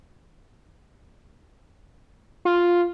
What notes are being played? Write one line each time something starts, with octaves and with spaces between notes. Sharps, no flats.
F4